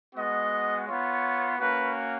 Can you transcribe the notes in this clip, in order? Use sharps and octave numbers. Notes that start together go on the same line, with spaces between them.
G#3 B3 F#4 D#5
B3 F4 C#5
A#3 C#4 F#4 B4